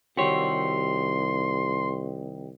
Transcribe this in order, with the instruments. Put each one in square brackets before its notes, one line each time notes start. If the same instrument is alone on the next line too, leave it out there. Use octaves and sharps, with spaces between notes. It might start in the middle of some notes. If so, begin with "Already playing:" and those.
[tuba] C2 [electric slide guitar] D#3 G4 [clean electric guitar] F#4 C#5 [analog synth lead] C6